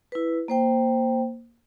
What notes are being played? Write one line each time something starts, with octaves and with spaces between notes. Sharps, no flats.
E4 B4
A#3 C5 G5